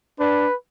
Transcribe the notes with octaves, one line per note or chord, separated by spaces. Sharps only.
D4 B4